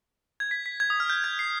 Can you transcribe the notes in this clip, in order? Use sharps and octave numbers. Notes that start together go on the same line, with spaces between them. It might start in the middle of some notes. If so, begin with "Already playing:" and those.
G#6
B6
B6
G#6
D#6
F6
G6
G#6
C7